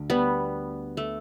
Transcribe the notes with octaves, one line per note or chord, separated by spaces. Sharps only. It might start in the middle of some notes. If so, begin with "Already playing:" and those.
Already playing: D2 D3 D4
G3 B3
A3